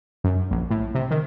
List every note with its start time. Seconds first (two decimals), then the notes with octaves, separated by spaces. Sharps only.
0.24 F#2
0.51 A#1
0.70 A2
0.95 C3
1.11 D#3